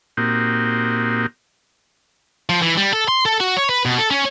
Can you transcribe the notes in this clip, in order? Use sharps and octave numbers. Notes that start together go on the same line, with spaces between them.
A#2 A#3 C4 D#4 F#4 G4
F3
E3
G3
A4
C6
A4
F#4
C#5
B4
B2
A4
C#4